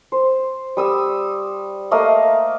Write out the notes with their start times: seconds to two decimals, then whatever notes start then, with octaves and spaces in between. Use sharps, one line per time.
0.12 C5
0.77 G3 D#6 E6
1.91 A3 A#3 D#5 F5